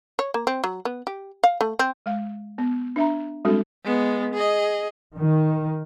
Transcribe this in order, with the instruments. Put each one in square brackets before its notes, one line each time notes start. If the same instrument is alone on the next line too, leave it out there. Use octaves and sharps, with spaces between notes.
[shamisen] C#5
A#3
C4
F#3
B3
G4
F5
A3
C4
[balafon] G#3 F5
B3
D4 E5 A#5
G3 G#3 C4 D4 F#4 A4
[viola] G#3 B3
G#4 D#5
[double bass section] D#3